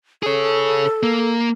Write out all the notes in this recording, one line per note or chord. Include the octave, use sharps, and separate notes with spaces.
G#4 A4 C#5
A#3